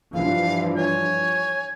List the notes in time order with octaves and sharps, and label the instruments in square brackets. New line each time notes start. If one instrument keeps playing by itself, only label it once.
[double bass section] G2 E3 F3 [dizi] F5
[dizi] C#5 [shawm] G#5